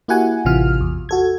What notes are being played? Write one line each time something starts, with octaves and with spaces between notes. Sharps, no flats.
A#3 E4 F#4 G4 F#5 G#5
A1 C3 E3 F4 F6
E2
F#4 A4 G#6